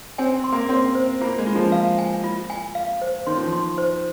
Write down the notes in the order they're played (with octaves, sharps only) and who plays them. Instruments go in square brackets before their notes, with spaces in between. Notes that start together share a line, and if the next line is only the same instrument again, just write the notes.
[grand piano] C4 [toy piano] G#5
[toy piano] C6
[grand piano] A#3
[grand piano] C4 [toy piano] C6
[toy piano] C5
[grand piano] A#3 [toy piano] F4
[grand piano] G#3
[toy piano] F4
[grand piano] F3
[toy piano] F5
G#5
F4
G#5
F5
C5
[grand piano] D#3 [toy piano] C6
[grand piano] F3
D#3
[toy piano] C6
C5